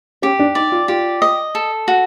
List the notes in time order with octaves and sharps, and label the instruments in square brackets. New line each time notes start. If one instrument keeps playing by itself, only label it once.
[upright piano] C#4 [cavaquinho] G4
[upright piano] D4
[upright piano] D#4 [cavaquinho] D5
[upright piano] F4
[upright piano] F4 [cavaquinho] G4
[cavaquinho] D#5
A4
F#4